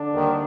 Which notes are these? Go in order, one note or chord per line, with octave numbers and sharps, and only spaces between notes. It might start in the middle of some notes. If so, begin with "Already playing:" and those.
Already playing: D3 D4
D#2 D#3 G3